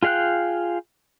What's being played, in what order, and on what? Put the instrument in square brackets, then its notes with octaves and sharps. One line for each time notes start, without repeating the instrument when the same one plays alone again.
[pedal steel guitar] F4 G#4 F5 G5 F#6